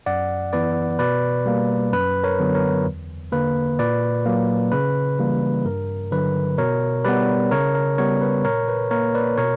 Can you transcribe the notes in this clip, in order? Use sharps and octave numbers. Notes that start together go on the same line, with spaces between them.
F#2 D5 F#5
E3 B3 B4 D5
B2 B4 D5
G3 A#3
F#2 B4
A#4 C#5
D3 F#3 B3
A#4 C#5
E2
D3 A#3 B4
A#2 B4 D5
F#3 A#3
C#3 B4
E3 G3 A#3
G2 A#4
D3 F#3 B4
B2 A#4 C#5
G3 B3 B4 D5
C#3 A#4 C#5
A#4
G3 B3 A#4 C#5
B4
A#2 A#4 C#5
B4
A#3 A#4 C#5
B4 D5
B2 A#4 C#5